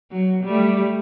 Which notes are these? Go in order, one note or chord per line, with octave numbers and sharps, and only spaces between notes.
F#3
G3 A3